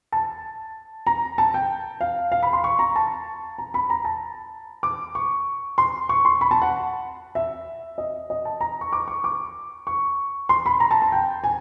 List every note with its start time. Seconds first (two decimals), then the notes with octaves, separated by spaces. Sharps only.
0.12 A5
1.07 A#5
1.38 A5
1.54 G5
2.01 F5
2.32 F5
2.43 B5
2.53 C6
2.64 C#6
2.79 A#5
2.96 A5
3.58 A#5
3.74 B5
3.90 A#5
4.05 A5
4.83 D6
5.15 C#6
5.78 C6
6.09 C#6
6.25 C6
6.41 B5
6.51 A5
6.62 F#5
7.35 E5
7.98 D#5
8.30 D#5
8.45 A5
8.61 A#5
8.81 C#6
8.93 D6
9.08 C#6
9.24 D6
9.87 C#6
10.49 C6
10.66 B5
10.80 A#5
10.91 A5
11.02 A5
11.12 G5
11.44 G#5